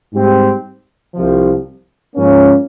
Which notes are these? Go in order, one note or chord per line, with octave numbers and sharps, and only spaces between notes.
G#2 G3 C4 G4
C2 C3 F3
G#2 F3 A#3 C#4